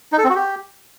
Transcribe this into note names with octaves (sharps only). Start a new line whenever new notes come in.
D#4
A4
C4
F#4
G4